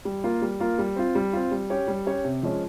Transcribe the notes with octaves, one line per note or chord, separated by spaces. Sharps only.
G3
A#3 F4 A#4
G3
A#3 F4 A#4
G3
C4 F4
G3
C4 F4
G3
C#4 G4 C#5
G3
C#4 G4 C#5
C3
F3 G#3 C#4